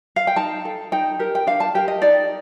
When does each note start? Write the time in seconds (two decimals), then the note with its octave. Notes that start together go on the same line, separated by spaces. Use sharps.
0.16 F5
0.27 G5
0.36 D#4 A5
0.65 A4
0.92 D#4 G5
1.19 G4 A#4
1.35 G5
1.47 D4 F5
1.60 A5
1.75 G4 A#4 G5
1.88 D#5
2.02 D#4 D5